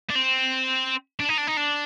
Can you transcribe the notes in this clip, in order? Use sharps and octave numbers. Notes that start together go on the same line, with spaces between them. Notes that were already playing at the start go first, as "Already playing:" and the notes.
D4
C4
D4
D#4
D4
D#4
D4